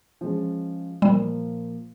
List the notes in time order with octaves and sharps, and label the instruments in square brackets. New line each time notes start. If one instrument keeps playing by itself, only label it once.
[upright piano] F3 G#3 C#4
[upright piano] A#2 F3 A#3 [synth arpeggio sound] G3